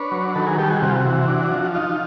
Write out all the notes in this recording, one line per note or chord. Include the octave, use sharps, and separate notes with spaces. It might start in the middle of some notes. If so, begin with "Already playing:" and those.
Already playing: D4 B4 C#5
F#3
D#3 A4 B4
G#4 A#4
G3 G4 A4
F#4 G#4
C3 F#4
F4
F#4
E3
D4
F3
D#4 F4